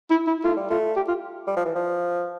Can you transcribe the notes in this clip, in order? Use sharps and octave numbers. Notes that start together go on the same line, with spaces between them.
E4
E4
A3 F4
G3
A3 F4
G4
F4
G3
F3
E3
F3